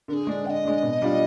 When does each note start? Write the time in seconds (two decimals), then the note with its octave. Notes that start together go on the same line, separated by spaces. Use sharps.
0.08 D3 A#4
0.13 G#4
0.27 G#3 D4
0.46 D3 D#5 G5
0.65 G#3 D4
0.83 B2
1.02 G3 D4 F4